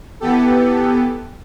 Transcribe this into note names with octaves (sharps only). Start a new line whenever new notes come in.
E3 B3 G4 A4